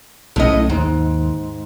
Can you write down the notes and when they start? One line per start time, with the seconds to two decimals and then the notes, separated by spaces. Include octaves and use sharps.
0.36 B1 A2 A3 C#4 D#5
0.70 D#2 G#2